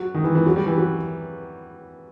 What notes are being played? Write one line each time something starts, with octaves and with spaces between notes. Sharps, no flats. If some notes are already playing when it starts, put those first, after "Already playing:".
Already playing: F#3
D#3
E3
E3
F#3
G3
E3
F#3